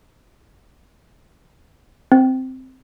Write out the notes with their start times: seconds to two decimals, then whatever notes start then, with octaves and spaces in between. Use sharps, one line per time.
2.12 C4